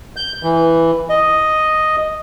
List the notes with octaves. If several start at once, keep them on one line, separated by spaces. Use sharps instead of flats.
G6
E3
D#5